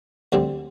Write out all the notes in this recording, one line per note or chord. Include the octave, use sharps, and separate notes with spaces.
D2 D3 G3 C4